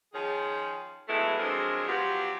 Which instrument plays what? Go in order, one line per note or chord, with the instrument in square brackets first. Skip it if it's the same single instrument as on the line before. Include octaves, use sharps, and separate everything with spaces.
[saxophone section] D#3 F3 C#4 G#4
F3 F#3 G#3 A3 B3 E4
F3 F#3 G#3 C4 D4 A#4
F3 F#3 B3 F4 G4